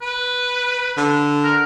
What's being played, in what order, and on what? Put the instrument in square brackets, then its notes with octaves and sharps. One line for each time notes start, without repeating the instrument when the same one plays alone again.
[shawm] B4
[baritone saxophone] D3
[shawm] A#4